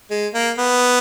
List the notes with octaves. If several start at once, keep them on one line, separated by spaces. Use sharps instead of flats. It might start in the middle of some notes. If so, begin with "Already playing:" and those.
G#3
A#3
B3